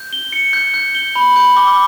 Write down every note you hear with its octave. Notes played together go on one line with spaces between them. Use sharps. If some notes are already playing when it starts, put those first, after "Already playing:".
Already playing: G6
G7
C#7
G6
G6
G7
B5
G6
D6